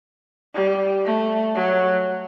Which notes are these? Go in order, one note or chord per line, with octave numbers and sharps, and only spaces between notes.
G3
A3
F#3